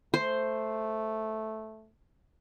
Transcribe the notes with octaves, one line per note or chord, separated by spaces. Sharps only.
A3 C5